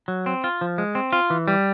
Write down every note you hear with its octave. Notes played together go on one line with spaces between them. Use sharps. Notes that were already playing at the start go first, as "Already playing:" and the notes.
F#3
C4
F4
F3
G#3
C4
F4
E3
G3